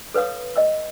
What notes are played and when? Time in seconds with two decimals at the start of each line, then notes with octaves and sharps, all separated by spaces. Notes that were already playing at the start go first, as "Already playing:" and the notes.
0.14 A4 B4 C#5 F5 D#6
0.56 D#5 E5 E6